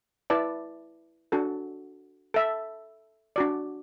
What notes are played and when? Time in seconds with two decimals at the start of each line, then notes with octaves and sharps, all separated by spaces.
0.30 E4 B4 D5 A5
1.32 D4 F#4 A4
2.34 A4 E5 A5
3.36 D4 F#4 D5